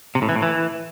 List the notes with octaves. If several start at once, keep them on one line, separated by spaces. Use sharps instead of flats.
C3
A2
E3
A2
E3